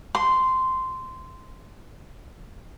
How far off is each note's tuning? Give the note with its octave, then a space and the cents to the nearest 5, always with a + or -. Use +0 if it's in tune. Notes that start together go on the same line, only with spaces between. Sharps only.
C6 -10